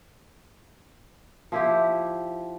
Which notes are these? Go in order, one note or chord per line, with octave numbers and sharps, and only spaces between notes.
F3 E4 G4